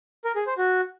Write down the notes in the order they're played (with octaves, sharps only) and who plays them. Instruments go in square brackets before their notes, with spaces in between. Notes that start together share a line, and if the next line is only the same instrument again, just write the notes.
[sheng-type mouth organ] A#4
G#4
C5
F#4